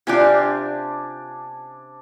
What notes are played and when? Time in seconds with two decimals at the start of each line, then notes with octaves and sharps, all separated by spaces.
0.07 C3 D4 F4 G4 G#5